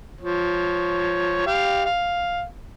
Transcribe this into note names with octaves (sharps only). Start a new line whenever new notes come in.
F3 C#5
G4 F5
F5